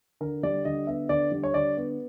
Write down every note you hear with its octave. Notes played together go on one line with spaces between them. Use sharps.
D3 A#4
G3 D5
D3 D#5
B3 E5
D3 D5
G3
C#5
D3 D5
B3